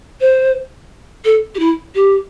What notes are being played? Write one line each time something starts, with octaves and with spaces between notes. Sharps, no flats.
C5
A4
G4
E4
G4